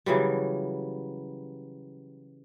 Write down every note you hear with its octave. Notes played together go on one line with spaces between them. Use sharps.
C#3 E3 F#3 G3